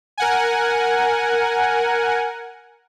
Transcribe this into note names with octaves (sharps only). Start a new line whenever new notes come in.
A#4 F#5 G#5